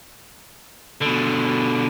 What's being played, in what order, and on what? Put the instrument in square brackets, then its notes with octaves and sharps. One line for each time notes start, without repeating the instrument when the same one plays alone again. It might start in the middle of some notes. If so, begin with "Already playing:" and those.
[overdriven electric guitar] B2 D3